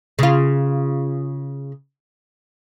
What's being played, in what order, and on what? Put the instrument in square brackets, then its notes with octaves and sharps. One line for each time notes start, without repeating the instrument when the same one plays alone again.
[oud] C#3 F4